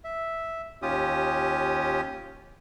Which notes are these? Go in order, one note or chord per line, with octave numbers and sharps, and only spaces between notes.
E5
D#2 C#4 F4 G4 D#6